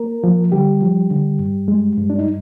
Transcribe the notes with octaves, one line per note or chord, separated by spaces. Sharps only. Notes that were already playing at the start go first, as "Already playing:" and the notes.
Already playing: A#3 A#4
F3
D3 G3 G4
F3
D3
G2
G#3
G2
D4
D#4